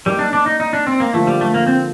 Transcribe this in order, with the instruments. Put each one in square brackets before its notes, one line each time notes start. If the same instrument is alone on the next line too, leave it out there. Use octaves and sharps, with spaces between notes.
[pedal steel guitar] G3 [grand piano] A#3 D#4 A#4 D5
[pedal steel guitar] D4
D4
D#4
D#4
D4
C4
A#3
[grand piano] D3 F3 A#3 F4 [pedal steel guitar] A3
[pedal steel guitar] G3
A3
A#3
C4